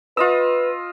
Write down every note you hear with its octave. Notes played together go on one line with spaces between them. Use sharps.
F4 B4 D#5 E6